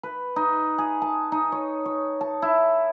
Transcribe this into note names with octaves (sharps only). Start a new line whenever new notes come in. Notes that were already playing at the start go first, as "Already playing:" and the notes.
B4
D#4
G#4
A5
D#4
C#5
C#5
A5
E4